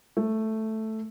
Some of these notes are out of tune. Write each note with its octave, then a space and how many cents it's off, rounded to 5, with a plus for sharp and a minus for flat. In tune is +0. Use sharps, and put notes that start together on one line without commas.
A3 +0